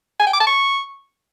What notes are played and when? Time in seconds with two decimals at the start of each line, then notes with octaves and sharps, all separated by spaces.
0.20 G#5
0.27 G5
0.33 D6
0.40 A5
0.47 C#6